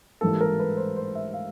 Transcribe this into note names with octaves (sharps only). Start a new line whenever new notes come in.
A1 G#2 E3 G3 A#3 A4
A#4
B4
C5
C5
E5
F5